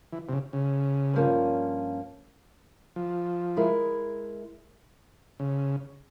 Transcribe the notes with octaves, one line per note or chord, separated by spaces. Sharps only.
E3
C3
C#3
C#3
G2 F3 A#3 C#4
F3
G#3 E4 A#4
C#3